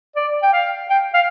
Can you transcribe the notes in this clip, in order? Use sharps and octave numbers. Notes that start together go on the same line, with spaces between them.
D5
G5
F5
G5
F5